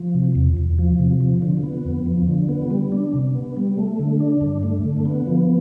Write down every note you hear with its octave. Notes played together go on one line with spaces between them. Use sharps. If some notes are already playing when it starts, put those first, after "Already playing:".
Already playing: F3
C3
E2
E2
F3
C3
F3
D3
B3
F2
F3
D3
B3
G3
D4
C3
B3
G3
A3
D3
D4
G2
A3
D3
B3
F3